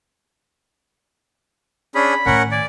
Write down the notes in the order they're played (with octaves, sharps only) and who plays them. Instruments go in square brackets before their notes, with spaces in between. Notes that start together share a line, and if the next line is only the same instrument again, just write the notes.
[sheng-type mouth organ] C#4 D4 G#4 [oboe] B5
[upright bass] A2 D#3 [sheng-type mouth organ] C#4 A#4 F#5
[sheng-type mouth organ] D5 [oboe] G#5